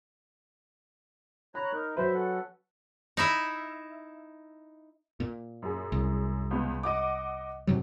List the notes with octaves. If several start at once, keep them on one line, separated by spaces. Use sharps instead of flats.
C#5 A#5 B5 F#6
D#4 A#4
F#3 B4 C5 E5
C#4 A4 F#5
D#4 E4 E5
A#2
F#2 G#4
C2
C#2 B3
D#5 F#5 D6
G#2 C3 F#3